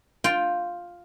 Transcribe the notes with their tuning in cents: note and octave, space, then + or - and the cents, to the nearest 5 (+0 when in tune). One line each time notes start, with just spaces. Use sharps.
F4 +5 G5 +0